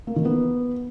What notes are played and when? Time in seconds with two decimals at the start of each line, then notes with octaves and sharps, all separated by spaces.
0.07 A#3
0.16 D#3
0.25 B3